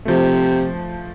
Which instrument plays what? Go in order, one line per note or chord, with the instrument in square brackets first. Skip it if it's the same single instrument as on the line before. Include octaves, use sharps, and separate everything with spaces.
[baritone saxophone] C3 [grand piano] F3 A3